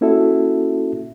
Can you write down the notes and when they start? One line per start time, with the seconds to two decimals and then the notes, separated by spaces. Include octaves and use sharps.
0.01 A#3 C#4 E4 F#4 A4 E5